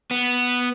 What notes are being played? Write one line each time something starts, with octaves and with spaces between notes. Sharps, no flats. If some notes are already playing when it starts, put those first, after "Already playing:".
B3